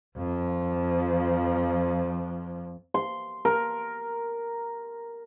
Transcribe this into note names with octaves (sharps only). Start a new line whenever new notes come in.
F2 F3
C6
A#4